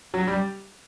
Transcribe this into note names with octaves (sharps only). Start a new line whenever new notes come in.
F#3
G3